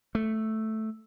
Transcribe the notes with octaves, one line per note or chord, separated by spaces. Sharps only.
A3